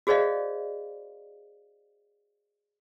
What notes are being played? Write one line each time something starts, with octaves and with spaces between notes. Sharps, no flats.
F#4 G#4 C5 D5 D#5 F5